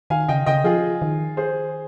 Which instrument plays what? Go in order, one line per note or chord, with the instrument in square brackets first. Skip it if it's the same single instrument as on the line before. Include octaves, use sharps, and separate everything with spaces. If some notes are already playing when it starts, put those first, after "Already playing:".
[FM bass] D#3 [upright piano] F5 G#5
[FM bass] C#3 [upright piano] D#5 G5
[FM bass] C#3 [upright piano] D#5 G5
[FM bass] F3 [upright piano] F4 G#4
[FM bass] D#3
[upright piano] G#4 C5